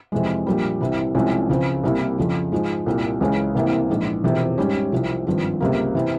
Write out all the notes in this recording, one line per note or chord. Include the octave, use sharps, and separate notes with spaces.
F2 C3 E3 G#3
A#1 A#2 G3
C2 C3 E3 G3
C2 C3 F3 G#3 C#4
C#2 C#3 F3 C4
C2 C3 G3 A#3 E4
F2 C#3 F3
G#2 F3 G#3
C2 A#2 G3
C#2 C#3 E3 G#3 C#4
C2 C3 E3 A#3
A#1 G#2 E3
E1 E2 C3 F3
G#2 G3 C#4 G4
C2 C3 F3
G#1 G2 F3 C4
C#2 C3 G3 A#3
C3 E3